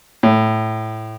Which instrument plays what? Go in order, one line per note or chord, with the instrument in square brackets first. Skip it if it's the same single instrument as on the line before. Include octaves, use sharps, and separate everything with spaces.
[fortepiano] A2